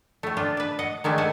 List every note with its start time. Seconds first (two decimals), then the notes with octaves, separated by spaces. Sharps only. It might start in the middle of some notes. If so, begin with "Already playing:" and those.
0.23 A2 A3
0.37 D4 F4
0.57 D4 B4
0.79 D#5 F#5
1.04 D#3 G#3 A3 D4
1.18 A4 F#5 G#5